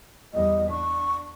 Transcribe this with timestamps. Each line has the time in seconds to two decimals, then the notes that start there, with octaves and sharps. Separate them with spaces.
0.33 E2 G3 D#5
0.69 D4 C#6